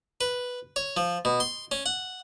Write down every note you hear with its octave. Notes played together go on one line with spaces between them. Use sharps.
B4
C#5
F3
B2
C6
C#4
F#5